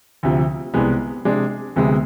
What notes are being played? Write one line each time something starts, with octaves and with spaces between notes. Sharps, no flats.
D2 C3 F3
C2 C3 G#3 B3
C3 G#3 D4
D2 C3 G#3 B3